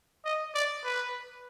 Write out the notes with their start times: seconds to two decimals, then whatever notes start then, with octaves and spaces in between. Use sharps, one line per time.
0.25 D#5
0.54 D5
0.84 B4